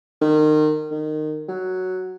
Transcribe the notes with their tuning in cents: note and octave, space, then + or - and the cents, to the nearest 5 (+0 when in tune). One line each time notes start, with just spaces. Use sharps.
D#3 -30
D#3 -20
F#3 +0